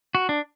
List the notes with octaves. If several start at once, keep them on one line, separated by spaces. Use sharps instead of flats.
F#4
D4